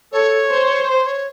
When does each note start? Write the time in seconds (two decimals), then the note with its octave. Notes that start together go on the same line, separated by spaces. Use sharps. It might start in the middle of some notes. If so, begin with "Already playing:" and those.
0.12 A4 C#5
0.50 C5
0.88 C5
1.06 C#5